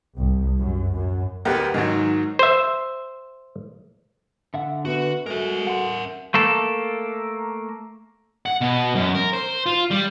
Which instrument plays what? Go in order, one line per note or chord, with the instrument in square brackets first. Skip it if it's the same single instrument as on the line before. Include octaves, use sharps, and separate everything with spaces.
[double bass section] C2
F#2
F#2
[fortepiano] D2 B3 B4 [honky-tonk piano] G4 A#4
[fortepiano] G#2 D#3 F#3 [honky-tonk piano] D#4
[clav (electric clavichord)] C5 E5
[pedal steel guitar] D3 E5 F#5
[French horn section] B3 [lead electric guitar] F#4
[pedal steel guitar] G#3 [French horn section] B3 F#4 A4 [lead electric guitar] A#4 E5
[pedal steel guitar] F#5 C6
[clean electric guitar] A3 A#3 A4
[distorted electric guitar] F#5
B2
F#2
A#4
C5
F4
G3